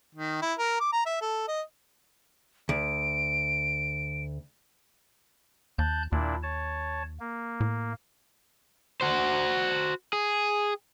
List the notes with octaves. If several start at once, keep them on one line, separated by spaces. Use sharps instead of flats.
D#3
E4
A#4
D6
A#5
E5
A4
D#5
D2 D7
D#2 A5 F#6 G6
D#2 A#2 D4 E4
C#5 A5
A#3
A2
F#4 C5
G#4